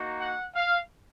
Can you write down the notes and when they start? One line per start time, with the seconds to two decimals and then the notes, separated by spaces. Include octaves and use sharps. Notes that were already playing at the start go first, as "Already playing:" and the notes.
Already playing: A#3 D#4 F#4
0.21 F#5
0.55 F5